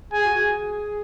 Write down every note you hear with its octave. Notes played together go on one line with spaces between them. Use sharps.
G#4 G#5
F#4
G#4